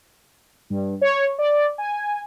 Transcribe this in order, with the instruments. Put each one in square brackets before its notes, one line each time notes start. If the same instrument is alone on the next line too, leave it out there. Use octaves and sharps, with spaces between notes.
[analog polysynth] G2
C#5
D5
G#5